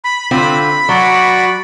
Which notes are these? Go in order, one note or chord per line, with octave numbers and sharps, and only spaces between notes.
B5
D3 C4 F4 B5
F#3 F#4 D5